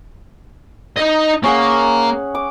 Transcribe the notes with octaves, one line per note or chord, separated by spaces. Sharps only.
D#4 D#5
A#3 C#4 G#4 F#5
D6